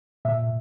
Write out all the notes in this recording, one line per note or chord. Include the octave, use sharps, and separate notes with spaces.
A#2 E5